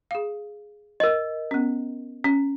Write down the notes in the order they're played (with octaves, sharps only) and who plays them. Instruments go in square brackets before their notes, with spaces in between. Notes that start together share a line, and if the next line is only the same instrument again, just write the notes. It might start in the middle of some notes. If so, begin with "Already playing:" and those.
[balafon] G#4 F5
[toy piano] A#4 D#5
[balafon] B3 C#4
C#4